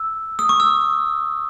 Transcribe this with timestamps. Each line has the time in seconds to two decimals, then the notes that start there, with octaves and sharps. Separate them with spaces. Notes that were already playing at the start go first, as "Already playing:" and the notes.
Already playing: E6
0.39 D#6
0.49 C#6
0.60 E6